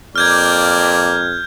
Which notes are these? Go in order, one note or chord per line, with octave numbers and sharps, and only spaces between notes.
F2 A#3 D5 F6 G6 G#6